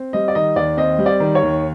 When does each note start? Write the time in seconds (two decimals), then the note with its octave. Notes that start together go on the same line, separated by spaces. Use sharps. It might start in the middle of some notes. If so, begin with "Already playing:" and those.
Already playing: C4
0.13 G3 D#5
0.28 D5
0.35 D#3 D#5
0.56 D#2 D5
0.77 C4 D#5
0.99 G3
1.06 D5
1.20 D#3
1.35 C#5
1.43 D#2